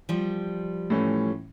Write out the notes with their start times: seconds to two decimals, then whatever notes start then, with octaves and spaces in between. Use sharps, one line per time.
0.09 F3 G3
0.90 A2 E3 A3 C#4